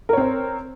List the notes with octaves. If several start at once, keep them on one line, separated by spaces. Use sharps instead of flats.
C4 A#4 C5 C#5